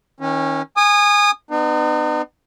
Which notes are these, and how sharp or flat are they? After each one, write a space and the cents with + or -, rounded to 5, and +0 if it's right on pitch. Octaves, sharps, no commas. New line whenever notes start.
D#3 +30 C#4 -15
G#5 -10 D#6 -25
B3 +20 D#4 -45